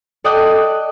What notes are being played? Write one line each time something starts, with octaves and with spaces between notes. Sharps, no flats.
A4 D5 D#5 G5 D#6 F#6